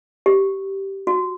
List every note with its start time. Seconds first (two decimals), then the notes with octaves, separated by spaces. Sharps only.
0.26 G4
1.07 F#4